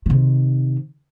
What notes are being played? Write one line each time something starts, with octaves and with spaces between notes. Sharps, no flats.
C3 D#3